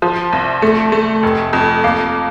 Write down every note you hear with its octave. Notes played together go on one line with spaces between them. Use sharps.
F3
C2
A3
A3
F1
F2
A#3